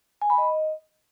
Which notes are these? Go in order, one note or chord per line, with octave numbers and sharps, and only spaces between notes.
G#5
B5
D#5